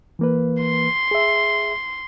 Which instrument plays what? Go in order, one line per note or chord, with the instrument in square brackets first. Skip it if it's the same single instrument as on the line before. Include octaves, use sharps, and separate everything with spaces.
[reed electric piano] E3 A#3 B4
[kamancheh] C6
[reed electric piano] G#4 E5